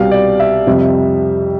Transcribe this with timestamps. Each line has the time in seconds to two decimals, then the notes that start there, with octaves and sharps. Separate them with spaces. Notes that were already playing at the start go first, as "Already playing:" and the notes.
Already playing: C2 B2 G3 F5
0.11 D5
0.40 E5
0.67 F2 C3 G3